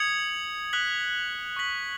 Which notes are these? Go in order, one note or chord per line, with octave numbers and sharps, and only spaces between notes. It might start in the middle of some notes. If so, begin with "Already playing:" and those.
Already playing: D#6 G#6 C#7 F#7
D#6 F#6 B6 F#7
C#6 B6 F#7